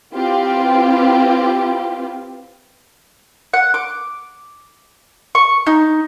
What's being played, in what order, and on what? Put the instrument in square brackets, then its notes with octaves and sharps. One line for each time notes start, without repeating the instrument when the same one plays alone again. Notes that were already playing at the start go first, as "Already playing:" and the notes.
[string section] C4 E4 F4 G4 B4
[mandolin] F#5
D6
C#6
D#4